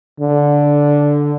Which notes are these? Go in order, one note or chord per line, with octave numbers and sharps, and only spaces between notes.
D3